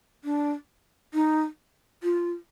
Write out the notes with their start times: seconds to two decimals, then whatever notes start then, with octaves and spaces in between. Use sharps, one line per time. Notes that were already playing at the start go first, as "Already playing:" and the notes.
0.24 D4
1.14 D#4
2.03 F4